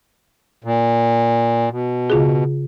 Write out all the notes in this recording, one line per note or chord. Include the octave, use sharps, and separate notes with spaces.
A#2
B2
C#3 F4 G#4